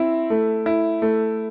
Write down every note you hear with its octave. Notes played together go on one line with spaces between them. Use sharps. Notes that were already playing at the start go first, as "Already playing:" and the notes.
Already playing: C4 E4
A3
E4
A3